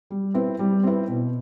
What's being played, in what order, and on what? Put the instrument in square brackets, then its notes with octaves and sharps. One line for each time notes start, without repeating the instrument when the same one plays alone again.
[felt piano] G3
C4 E4 B4
G3
C4 E4 B4
B2